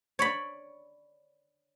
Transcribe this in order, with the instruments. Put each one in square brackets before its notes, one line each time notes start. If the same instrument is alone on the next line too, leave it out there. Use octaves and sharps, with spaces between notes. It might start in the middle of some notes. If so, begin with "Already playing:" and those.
[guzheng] C#5 D5 B5